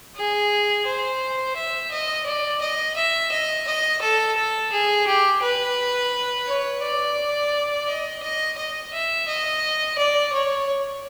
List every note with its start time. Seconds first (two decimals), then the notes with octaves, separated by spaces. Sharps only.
0.16 G#4
0.87 C5
1.56 E5
1.92 D#5
2.27 D5
2.61 D#5
2.97 E5
3.32 D#5
3.67 D#5
4.02 A4
4.37 A4
4.72 G#4
5.07 G4
5.42 B4
6.47 C#5
6.83 D5
7.87 D#5
8.23 D#5
8.58 D#5
8.93 E5
9.28 D#5
9.98 D5
10.33 C#5